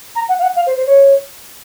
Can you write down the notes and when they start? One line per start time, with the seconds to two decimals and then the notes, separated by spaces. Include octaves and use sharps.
0.15 A#5
0.29 F#5
0.39 F5
0.42 F#5
0.56 F5
0.66 C5
0.77 C5
0.86 C#5